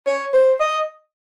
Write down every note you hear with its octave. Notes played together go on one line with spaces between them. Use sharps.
C#5
C5
D#5